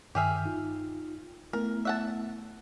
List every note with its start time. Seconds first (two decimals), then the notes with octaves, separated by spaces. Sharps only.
0.15 G2 D#3 G4 G#4 E5 F6
0.45 D#4 F4
1.53 A3 B3 E4 A#4
1.85 E5 F#5 A5